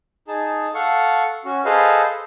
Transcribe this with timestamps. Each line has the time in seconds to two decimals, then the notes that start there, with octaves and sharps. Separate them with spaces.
0.28 D#4 G#4 A5
0.75 A4 F5 F#5 C#6
1.45 C#4 F#4
1.65 G#4 A4 B4 C5 D#5 F5